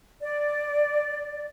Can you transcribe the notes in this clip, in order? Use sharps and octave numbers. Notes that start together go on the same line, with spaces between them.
D5